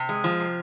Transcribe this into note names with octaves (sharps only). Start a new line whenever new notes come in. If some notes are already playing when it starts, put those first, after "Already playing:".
Already playing: C3
G#3
F3
C3